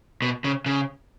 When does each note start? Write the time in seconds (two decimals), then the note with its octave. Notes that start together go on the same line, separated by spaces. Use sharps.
0.22 B2
0.44 C#3
0.66 C#3